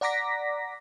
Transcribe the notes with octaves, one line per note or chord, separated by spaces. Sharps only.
D5 F#5 A#5 D6 A#6 B6